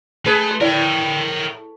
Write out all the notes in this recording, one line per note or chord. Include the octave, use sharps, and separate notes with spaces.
A3 G#4 B4
G4 D#6
A2 E4 A#4 D5 F5 G5